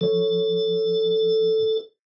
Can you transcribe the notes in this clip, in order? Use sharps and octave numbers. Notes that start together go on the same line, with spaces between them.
F3 A4 C#5